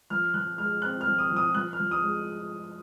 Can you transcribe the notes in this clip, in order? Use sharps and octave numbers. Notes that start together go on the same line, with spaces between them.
F3 F6
F3 F#6
G#3 F6
C4 F#6
F6
F3
D#6
F3
D#6
F3 F#6
F6
F3
D#6
G#3